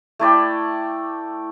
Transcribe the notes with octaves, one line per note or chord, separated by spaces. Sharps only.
A3 E4 D5 G5